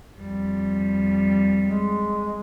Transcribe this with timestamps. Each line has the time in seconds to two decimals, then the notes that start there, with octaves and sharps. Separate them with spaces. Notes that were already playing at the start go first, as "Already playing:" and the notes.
0.17 F2 G3
1.63 G#3